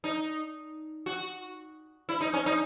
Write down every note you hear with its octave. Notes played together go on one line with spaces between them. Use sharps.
D#4
F#4
E4
D#4
C#4
D#4